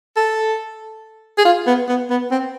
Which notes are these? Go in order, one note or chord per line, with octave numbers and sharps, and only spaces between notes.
A4
G#4
F4
B3
B3
B3
C4